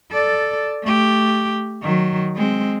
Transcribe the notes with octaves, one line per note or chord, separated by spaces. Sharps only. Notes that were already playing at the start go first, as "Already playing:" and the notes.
A4 D5
A3 G4
D#3 F#3
G#3 C4